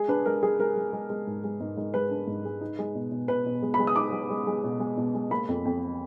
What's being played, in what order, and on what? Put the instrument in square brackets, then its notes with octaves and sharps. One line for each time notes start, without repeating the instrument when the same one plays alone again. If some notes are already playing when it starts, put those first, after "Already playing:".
Already playing: [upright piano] G#3 G#4
D4 B4
G#3 A#4
G#3 G#4
G#3 A#4
G#3
G#3
G#3
G#2
G#3
G#2
G#2
G#3 B4
D4
G#2
G#3
D#4
G#3
B2
B2
B2 B4
B2
G#3
B5
G#3
D#6
D#4 D6
G#3
G#3
G#3
B2
G#3
B2
G#3
A#3 B5
F2
F2